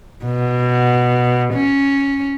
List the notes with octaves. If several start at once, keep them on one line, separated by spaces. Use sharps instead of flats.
B2
C#4